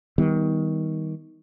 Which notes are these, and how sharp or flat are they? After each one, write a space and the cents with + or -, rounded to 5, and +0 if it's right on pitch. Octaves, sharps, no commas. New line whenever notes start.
D#3 +25 G3 +0 B3 +10